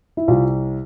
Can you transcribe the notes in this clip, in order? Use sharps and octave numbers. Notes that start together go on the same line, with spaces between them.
E4
C2 F4